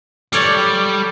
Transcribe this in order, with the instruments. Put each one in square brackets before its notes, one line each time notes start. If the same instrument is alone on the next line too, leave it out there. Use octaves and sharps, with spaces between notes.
[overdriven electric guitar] G3 [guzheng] A4 C#5 D5